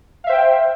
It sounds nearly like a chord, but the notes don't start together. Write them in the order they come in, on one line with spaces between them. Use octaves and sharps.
F5 E5 C5 G5